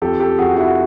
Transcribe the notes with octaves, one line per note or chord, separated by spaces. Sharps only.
F2 G4 A4
G4 A4
F2 F#4 G#4
E4 F#4